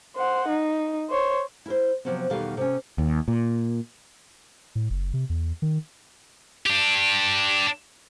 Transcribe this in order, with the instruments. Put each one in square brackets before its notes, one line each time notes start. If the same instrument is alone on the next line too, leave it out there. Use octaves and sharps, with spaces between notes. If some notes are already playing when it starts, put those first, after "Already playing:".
[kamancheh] C5 F#5
D#4
C5 C#5
[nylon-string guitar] E4 A#4 C5
C3 F3 F#3 B3 C4
E2 B2 D#3 G3 A4 F5
C3 C#4
[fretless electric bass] D#2
A#2
[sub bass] A2
F#1
C3
E2
D#3
[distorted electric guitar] D4 G4